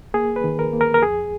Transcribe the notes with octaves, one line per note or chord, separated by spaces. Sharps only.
A#3 G#4
B4
D#3
A#4
A#3
A#4
A#4
F2 G#4